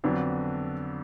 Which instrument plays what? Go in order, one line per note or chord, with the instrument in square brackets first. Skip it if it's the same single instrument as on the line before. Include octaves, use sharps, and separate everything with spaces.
[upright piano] F2 D3 F#3 B3 D4